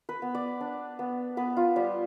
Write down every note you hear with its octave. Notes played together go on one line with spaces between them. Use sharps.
B4
B3
D5
D4
B3
B3 B4
F4
G3 G4